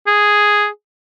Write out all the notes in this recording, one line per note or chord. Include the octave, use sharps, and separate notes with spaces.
G#4